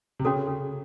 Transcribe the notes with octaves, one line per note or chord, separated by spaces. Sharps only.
C3
C#3 C#4 F#4 A4
C#3